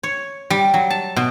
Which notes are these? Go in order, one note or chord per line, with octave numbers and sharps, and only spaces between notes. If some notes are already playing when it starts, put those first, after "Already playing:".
C#5
G3
F#3
A5
B2